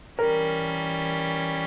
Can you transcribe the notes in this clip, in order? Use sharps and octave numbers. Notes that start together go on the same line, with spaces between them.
E3 G3 C#4 A#4